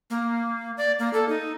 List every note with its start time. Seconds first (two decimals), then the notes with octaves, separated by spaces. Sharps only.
0.10 A#3
0.77 D5
0.99 A#3
1.13 A4
1.29 D#4